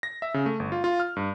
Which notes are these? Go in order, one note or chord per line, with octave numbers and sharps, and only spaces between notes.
A#6
E5
C#3
A3
G1
F4
F4
F6
G2